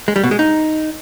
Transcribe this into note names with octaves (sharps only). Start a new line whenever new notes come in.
G#3
G3
B2
G#3
D#4